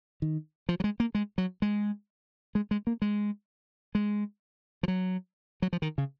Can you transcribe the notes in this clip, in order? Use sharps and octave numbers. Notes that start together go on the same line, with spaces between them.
D#3
F3
F#3
G#3
A#3
G#3
F#3
G#3
G#3
G#3
A#3
G#3
G#3
F3
F#3
F#3
F3
D#3
C#3